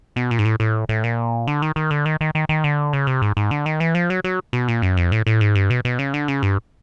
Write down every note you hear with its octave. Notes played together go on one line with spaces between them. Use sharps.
B2
A#2
G#2
A2
A2
A2
A#2
D3
D#3
D#3
D3
D#3
D#3
D#3
D#3
D3
C#3
C3
G#2
G#2
D3
D#3
E3
F3
F#3
F#3
B2
A#2
F#2
F2
A2
A2
G#2
G2
B2
B2
C#3
D3
C#3
G2